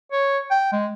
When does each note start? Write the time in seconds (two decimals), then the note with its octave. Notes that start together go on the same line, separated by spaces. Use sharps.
0.12 C#5
0.51 G5
0.72 G#3